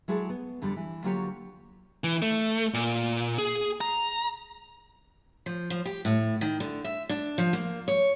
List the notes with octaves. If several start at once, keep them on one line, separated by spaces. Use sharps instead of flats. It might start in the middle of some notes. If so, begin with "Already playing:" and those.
F#3 G#3 E4 G#4 A4
B3
F2 D3 G3
E3
D3 F#3 A#3 F4 G4 C#5
E3
A3
A#2
G#4
A#5
F3
F3
G4
A2
D#3
D3
E5
D4
F3
A#3
C#5